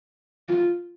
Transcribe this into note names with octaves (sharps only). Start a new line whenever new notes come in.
F4